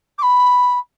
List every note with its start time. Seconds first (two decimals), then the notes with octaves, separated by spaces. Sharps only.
0.18 D6
0.23 B5